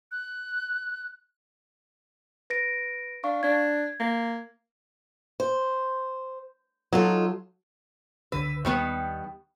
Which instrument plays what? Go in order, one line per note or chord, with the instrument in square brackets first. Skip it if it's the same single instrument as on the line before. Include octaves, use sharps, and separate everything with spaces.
[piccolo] F#6
[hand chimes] B4 A#6 D7
[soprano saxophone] D4 [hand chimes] F5 C#6
[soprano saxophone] D4 [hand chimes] G#6
[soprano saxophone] A#3
[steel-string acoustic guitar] C5
[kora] F#3 [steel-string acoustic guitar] D#4 F4 A4
[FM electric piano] C#2 D3 E6 [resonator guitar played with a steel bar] B4
[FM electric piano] D#2 [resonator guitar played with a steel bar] D#3 G3 B3